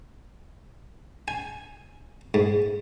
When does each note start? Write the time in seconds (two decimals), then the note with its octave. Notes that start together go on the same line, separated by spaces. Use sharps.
1.28 G#5
2.34 G#2